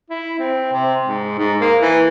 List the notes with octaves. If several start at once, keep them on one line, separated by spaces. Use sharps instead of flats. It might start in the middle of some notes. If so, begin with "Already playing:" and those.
E4
C4
C3
G#2
G#2
A#3
E3